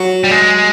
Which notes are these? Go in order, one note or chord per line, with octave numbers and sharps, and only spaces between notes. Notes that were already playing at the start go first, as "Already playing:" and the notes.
Already playing: F#3
G3
G#3